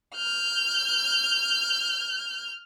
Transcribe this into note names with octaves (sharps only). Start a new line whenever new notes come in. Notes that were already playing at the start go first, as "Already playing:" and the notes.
F6 G6